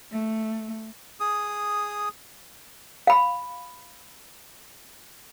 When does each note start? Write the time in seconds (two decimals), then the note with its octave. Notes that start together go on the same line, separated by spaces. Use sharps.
0.12 A3
1.20 G#4 D#6
3.07 F5 B5